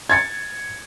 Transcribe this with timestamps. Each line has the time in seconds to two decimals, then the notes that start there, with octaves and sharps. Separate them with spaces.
0.10 G#6 A6 C#7